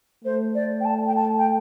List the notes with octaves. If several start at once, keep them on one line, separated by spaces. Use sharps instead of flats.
A3 C5
D5
G5
A5
G5
A5
G5